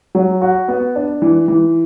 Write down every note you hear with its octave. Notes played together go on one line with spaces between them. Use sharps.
F#3
F#4
B3
D4
E3
E3